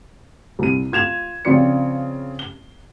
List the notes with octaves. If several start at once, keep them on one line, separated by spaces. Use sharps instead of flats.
C2 D#7
F4 G#6 E7 F7
C#3 F3 C4 F4 D5 C#7
G7